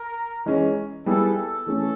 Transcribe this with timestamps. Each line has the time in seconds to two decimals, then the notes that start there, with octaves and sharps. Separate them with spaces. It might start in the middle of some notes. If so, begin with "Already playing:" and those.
Already playing: A#4
0.46 E3 G#3 C#4
1.06 G3 B3 E4 G#4 A4
1.37 A4
1.67 E3 A3 C#4